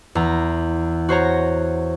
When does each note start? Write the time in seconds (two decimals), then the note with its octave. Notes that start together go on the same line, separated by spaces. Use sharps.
0.15 E2 A#5
1.09 F#4 C5 C#5 A#5